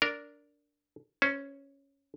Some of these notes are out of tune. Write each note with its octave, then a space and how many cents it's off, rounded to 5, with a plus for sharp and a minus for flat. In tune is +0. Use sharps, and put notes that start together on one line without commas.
D4 -10 A#4 -5
C#4 +0 C5 -35